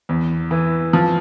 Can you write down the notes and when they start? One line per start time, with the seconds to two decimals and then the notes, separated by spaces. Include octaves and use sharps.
0.09 E2
0.51 E3
0.93 F3